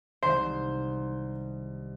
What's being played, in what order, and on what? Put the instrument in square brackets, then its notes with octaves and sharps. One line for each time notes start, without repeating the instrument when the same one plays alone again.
[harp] C2 D#3 G#3 [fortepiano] C5